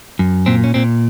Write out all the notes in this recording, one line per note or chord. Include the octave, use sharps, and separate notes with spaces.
F#2
A#2 C4
C#4
A#2 C4